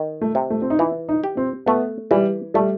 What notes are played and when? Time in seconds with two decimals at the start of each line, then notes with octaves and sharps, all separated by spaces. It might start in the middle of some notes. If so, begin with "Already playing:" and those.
Already playing: D#3
0.21 A3
0.35 C3
0.50 A3
0.62 C4
0.70 D#4
0.79 E3 E4
1.09 D#4
1.24 G4
1.37 C4
1.66 A3 B3
2.11 E3 G3
2.54 G3 A3